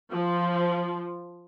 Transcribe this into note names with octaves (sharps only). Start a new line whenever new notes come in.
F3